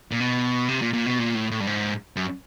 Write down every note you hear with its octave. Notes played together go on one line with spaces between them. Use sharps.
A#2
B2
C3
A#2
A#2
B2
A#2
A2
A2
G2
G#2
F#2